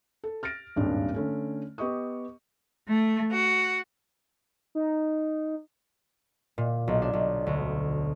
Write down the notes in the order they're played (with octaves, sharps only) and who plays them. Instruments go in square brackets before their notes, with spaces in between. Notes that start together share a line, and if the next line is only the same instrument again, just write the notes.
[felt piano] A4
F6 A6 A#6 D7
D#1 G#1 G2 C#4 D4
D3 A3 C#4
B3 G4 D#5 C#6 D#6
[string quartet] A3
F#4
[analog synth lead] D#4
[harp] A#2
B1
D4
B1
D2